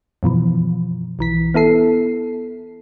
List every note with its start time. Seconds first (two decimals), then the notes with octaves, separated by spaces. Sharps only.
0.23 F#2 B2 E3 F3
1.19 B1 E3 B6
1.54 B3 E4 A4 C7